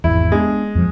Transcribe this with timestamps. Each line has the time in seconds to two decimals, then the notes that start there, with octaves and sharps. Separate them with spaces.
0.04 G#1 E2 E4
0.32 G#3 B3 D4
0.75 F2 F3